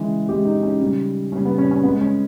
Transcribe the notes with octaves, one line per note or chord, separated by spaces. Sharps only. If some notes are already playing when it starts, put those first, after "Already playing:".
Already playing: C#3 E3 G#3
C#3 E3 G#3 G4
D#4
C#4
C#3 G3
C#3 G3 C#4
B3
C#4
C#4
C#3 G#3 B3
C#4